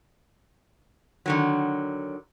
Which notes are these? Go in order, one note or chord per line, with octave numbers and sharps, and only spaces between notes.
D3 D#3 F#3